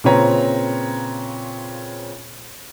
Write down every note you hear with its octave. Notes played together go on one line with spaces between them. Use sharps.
A#2 C#3 C4 B4 C#5 A#5